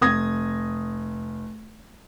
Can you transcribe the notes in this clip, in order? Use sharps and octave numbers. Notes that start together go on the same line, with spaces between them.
F1 D#6 G#6 A#6